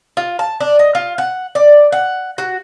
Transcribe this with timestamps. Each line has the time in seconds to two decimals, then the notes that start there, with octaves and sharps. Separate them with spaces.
0.17 F4
0.39 A5
0.60 D4
0.79 D#5
0.95 F4
1.18 F#5
1.55 D5
1.92 F#5
2.38 F#4